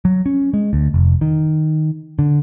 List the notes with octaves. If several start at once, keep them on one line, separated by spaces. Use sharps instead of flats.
F#3
C#4
G#3
D2
F1
D#3
D3